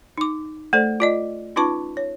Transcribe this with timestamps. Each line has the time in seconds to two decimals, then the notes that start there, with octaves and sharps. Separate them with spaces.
0.18 D#4 D6
0.73 A3 A4 C5 D5
1.00 F4 D5 D#5
1.56 C#4 D#4 F4 B4 A5 C#6
1.97 C#5